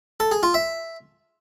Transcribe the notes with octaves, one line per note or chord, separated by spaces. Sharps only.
A4
G#4
F4
E5